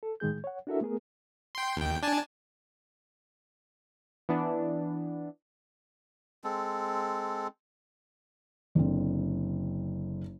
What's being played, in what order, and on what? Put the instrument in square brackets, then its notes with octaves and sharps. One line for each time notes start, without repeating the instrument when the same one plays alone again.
[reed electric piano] A4
A2 D#3 G#3 G#4 G6
C#5 F#5
D4 E4 F#4 A4 A#4 E5
A3 B3 G#4 A#4
[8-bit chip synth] G5 C6
D#2 G5
D4 G#5 A5
[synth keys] E3 B3 D4
[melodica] G#3 C4 A4
[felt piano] F#1 D3 C4